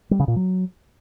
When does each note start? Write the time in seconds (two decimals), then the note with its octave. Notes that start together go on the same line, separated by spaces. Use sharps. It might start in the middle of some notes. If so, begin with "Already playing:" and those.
0.11 G3
0.19 C#3
0.28 A#2
0.36 F#3